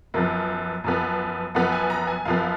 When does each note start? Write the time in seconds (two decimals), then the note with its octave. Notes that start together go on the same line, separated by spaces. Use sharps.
0.14 F#2 F3 B3 A#4
0.84 F#2 F3 B3
1.55 F#2 F3 B3 F#5
1.72 G#5
1.90 A#5
2.07 G#5
2.25 F#2 F3 B3 F5